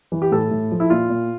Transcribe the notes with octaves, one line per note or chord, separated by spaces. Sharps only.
E3
G4
A2 A4
A2
F3
E4
A#2 F4
A#2